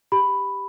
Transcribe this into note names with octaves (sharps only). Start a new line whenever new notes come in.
G4 B5